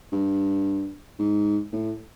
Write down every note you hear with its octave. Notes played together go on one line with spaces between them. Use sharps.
G2
G#2
A2